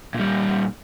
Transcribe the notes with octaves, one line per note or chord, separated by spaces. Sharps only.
A#2 G3